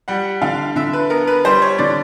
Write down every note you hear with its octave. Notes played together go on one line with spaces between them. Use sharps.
G3 F#5
D3 F5
D3 E5
B4
B3 A#4
B4
G3 C5
C#5
D3 D5